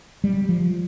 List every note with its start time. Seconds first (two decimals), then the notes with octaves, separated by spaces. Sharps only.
0.24 G3
0.49 F3